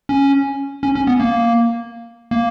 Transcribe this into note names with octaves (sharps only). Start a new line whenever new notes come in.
C#4
C#4
C#4
B3
A#3
A#3